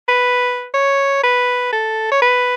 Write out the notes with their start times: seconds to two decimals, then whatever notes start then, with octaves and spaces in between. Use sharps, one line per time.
0.09 B4
0.74 C#5
1.23 B4
1.72 A4
2.11 C#5
2.22 B4